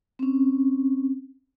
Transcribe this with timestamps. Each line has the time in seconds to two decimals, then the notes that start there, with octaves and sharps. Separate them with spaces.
0.19 C4 C#4